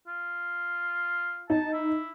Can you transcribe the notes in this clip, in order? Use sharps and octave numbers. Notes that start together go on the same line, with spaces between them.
F4
D#4 A5
E4